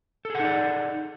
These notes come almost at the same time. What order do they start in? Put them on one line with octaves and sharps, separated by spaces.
A4 G#4 F#5 D#4 D5